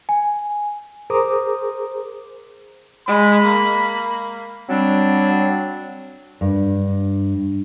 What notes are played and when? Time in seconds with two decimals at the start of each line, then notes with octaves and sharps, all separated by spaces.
0.09 G#5
1.10 G#4 A#4 C5 A#5 D6 D#6
3.08 G#3 B5
3.45 A#3
4.69 F#3 G3 C4 D4
6.41 G2